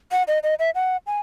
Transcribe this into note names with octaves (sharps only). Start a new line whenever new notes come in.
F#5
D#5
D#5
E5
F#5
G#5